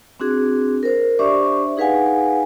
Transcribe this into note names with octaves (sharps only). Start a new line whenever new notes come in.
C4 D4 F#4 G#4
A#4 C5
D4 G4 C5 D5 E5 C#6
D#4 G#4 B4 F5 F#5 G#5